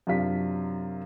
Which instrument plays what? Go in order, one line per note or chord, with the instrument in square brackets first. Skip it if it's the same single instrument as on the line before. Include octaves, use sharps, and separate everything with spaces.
[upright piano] F#2 C3 D4 F4 B6